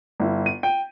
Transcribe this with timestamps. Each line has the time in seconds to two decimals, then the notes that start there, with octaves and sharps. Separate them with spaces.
0.20 G1 E4
0.46 D#7
0.63 G5